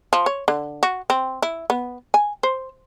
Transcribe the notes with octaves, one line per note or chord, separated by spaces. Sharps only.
F3
C#5
D3
F#4
C4
E4
B3
G#5
C5